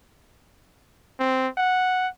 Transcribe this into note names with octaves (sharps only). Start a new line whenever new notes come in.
C4
F#5